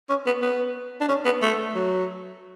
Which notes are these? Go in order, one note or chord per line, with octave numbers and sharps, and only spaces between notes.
C#4
B3
B3
D4
C#4
B3
A3
F#3